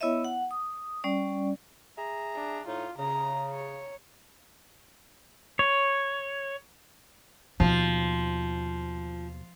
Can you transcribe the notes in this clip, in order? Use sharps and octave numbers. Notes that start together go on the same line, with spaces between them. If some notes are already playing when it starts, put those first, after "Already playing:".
B3 E4 C#5 D#5 E5
F#5
D#6
G3 C#4 D5
G#4 E5 A#5
D4
A2 D#4 F4
C#3 A#5
C#5
C#5
D#2 B2 F3